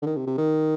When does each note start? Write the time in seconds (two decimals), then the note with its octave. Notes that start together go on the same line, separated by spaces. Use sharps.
0.02 D3
0.06 D#3
0.16 C3
0.27 C3
0.38 D#3